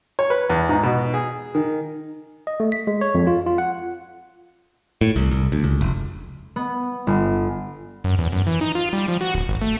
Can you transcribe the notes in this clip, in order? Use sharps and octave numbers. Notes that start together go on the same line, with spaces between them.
C#5
B4
E2
G#2
B2
G#4
D#3
D#5
A3
B6
G#3
C#5
F2
F4
F4
F#5
A2
C2
C2
D2
C#2
F1
B3
G1
F#2
E2
F#2
E3
D#4
F4
G3
F3
F#4
D1
G#1
A3